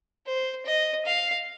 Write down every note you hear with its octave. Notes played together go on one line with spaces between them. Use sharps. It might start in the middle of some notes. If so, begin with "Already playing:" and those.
C5
D#5
F5